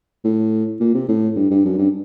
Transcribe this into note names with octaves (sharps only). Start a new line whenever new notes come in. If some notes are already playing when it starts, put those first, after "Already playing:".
A2
A#2
C3
A2
G2
G2
F#2
G2